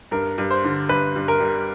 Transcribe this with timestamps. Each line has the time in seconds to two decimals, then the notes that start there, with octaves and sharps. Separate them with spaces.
0.11 G2 A#4
0.38 G2
0.51 C5
0.64 D3
0.89 G2 B4
1.16 G2
1.28 A#4
1.40 G3